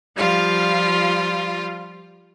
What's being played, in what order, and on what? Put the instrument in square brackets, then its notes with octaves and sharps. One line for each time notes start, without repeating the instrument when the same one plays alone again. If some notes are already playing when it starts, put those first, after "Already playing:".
[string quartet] F3 G3 F4 F5